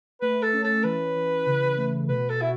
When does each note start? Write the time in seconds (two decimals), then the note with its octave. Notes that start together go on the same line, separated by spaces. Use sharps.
0.22 A3 B4
0.43 A4
0.53 C#4
0.64 A4
0.84 E3 B4
1.15 E3
1.47 C#3
1.78 A3
2.08 B2 B4
2.30 A4
2.40 E4 F#4